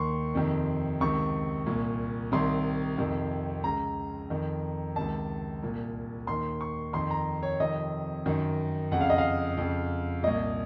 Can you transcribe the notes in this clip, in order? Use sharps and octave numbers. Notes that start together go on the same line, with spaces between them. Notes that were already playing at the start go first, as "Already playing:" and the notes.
Already playing: D#2 D#3 C6 C#6
F2 C3 D#3
C#2 C3 D#3 C#6
C2 A#2
C2 C3 D#3 C6
F2 C3 D#3
C#2 C#3 A#5
F2 D#3
C#2 C3 D#3 A5
C2 A#2
D#2 D#3 C6
C#6
F2 D#3 C6
A#5
C#5
F2 C3 D#3 D#5
F#2 D#3
F2 F#5
C#3 F5
D#5
F5
F2 C#3
C2 A#2 D#5